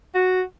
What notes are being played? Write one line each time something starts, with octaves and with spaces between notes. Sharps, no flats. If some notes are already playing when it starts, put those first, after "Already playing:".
F#4